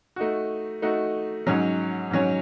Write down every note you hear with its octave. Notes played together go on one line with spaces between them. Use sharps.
A3 D#4 F#4
A3 D#4 F#4
G#2 F#3 C#4
G#2 F#3 C#4